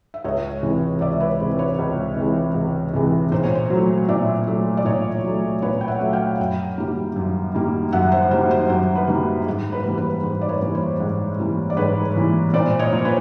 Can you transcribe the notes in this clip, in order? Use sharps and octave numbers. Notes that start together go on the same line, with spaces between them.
E5
C#2 C#5 D#5
C3 E3 G#3
C#2 D5 E5
B4 C#5
C3 E3 G#3 C5
B4 C#5
C#2
C3 E3 G#3
C#2
C3 E3 G#3
A#2 C5
C#5
C5
F#3 A3
A#2 D5 E5
F#3 A3
D5
A#2 C#5 D#5
F#3 A3
A#2 B4 C#5
G5
E5 F#5
F#3 A3
F5 G5
F#2
D#3 G3 A#3
F#2
D#3 G3 A#3
F#2 E5 F#5
C5
D#3 G3 A#3 C5
C5
F#2 C5
B4
D#3 G3 A#3
G#2
B4
E3 G3 A#3
B4
G#2 C5
D5
B4 C#5
E3 G3 A#3
C5
G#2
E3 G3 A#3
D5
G#2 B4 C#5
E3 G3 A#3
A#2 C5 D5
C#5 D#5
F3 A#3
C5
B4 C#5